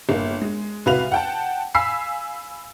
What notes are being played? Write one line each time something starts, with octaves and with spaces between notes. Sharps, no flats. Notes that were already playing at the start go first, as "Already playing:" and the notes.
G1 A#3
G#3
C2 F#4 B4 F5 F7
F#5 G5 A5
F5 G#5 B5 E6 B6 C7